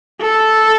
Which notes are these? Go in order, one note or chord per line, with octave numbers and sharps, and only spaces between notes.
A4